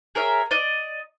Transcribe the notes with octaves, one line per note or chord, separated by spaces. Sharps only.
G#4 A#4 C#5 E5
D5 D#5